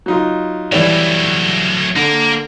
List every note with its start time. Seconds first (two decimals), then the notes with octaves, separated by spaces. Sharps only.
0.06 F#3 D#4 F4
0.72 E3 F#3 G3 A3 D5
1.96 D3 A#3